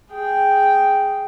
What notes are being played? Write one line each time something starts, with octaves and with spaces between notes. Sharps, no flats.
G#4 G5